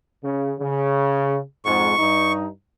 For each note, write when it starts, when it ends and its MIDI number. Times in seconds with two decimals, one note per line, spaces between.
0.23 0.53 49
0.59 1.39 49
1.65 1.93 41
1.65 1.93 44
1.65 2.32 85
1.99 2.45 43
1.99 2.45 63